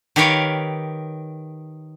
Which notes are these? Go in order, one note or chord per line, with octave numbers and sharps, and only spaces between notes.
D#3 G4 A#4 B4 C#5 F5